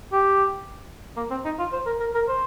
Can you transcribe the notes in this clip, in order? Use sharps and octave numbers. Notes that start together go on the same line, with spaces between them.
G4
A#3
C4
D#4
F4
C5
A#4
A#4
A#4
C5